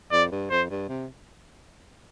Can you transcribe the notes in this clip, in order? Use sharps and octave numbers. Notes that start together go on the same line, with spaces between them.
F2 D5
G2
F2 C5
G2
C3